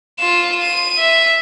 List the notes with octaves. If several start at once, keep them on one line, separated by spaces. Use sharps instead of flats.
F4 E7
D#7
E5